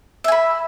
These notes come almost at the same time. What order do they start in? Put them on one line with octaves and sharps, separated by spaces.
E5 G#5 B5